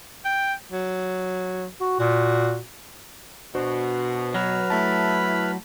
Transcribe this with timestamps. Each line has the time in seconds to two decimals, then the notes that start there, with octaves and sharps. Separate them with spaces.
0.25 G5
0.72 F#3
1.81 F#4
2.00 A#2 F#4
3.55 B2 D4 F#4 C5
4.34 F#3 B4 F6
4.70 A3 E4 A5 B5